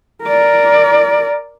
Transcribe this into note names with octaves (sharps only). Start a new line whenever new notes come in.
A#4 D5